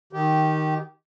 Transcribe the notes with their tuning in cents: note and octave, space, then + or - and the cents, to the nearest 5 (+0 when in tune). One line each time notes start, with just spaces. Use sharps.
D#3 +0 G4 -20